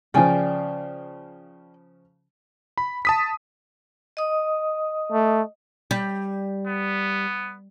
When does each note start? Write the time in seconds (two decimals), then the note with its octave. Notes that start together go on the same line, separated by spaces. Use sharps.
0.14 C#3 F3 D5 G5 G#5
2.78 B5
3.05 A5 D#6 B6
4.17 D#5 D#6
5.12 A3
5.91 G3
6.66 B3